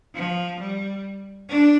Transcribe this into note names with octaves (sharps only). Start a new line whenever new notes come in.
F3
G3
D4